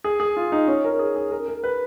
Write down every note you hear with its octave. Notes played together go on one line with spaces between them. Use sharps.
G#4
G#4
F4
D#4
C#4
A#4
G#4
G#4
A#4
A#4
B4